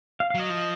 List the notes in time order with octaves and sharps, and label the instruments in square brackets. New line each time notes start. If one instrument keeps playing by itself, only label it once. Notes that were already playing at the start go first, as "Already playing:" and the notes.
[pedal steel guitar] F5
F5
[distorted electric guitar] F#3 [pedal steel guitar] D#5
[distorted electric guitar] F3